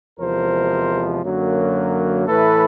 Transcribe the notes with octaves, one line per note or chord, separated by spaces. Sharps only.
E2 C3 F3 G#3 A#4 C5
F#2 D3 F#3 A#3
A2 E3 A3 A4 B4